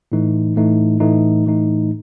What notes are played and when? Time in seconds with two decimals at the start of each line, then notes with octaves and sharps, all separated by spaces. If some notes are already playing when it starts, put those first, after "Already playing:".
0.12 A2 E3 A3 D#4
0.56 A2 E3 A3 D#4
1.00 A2 E3 A3 D#4
1.46 A2 E3 A3 D#4